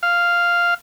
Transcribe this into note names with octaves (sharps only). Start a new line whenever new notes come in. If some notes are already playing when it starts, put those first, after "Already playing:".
F5